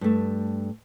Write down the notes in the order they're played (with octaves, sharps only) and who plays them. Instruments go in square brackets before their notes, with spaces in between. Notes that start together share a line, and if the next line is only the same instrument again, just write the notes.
[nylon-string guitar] G2 A3